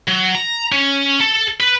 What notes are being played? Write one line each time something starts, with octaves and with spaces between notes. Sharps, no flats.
F#3
A#5
C#4
A4
B4